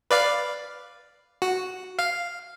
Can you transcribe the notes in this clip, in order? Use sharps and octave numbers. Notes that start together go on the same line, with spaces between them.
B4 D5 F5
F#4
F5